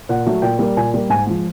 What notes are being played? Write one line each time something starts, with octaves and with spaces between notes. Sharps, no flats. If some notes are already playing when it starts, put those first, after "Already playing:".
A#2 F#5
F#3 A3
A#2 G5
G3 A#3
A#2 G#5
G3 A#3
G#2 G#5
F3 G#3